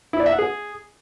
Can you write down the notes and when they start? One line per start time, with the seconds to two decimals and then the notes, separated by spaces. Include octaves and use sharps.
0.13 E4
0.20 D5
0.26 E5
0.32 F#5
0.39 G#4